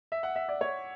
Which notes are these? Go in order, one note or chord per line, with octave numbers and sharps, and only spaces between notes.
E5
F#5
E5
D5
C#5